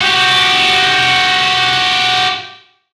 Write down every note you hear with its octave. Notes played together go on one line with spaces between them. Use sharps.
F#4 G4